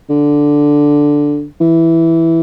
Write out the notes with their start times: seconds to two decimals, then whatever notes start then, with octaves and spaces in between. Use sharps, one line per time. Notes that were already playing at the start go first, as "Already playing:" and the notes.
0.09 D3
1.60 E3